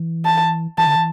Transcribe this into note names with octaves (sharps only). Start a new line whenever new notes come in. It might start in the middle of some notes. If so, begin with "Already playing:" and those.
Already playing: E3
A5
E3 A5
D3
E3